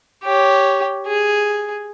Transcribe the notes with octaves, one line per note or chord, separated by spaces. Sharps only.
G4 C#5
G#4